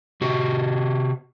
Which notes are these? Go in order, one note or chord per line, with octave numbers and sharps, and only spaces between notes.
C3 F#4 G4